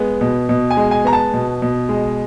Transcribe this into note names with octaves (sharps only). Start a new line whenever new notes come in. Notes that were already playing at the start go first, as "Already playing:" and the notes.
Already playing: G#3 B3
B2
B2
G#5
G#3
G#5
B3 A#5
A5
B2
B2
G#3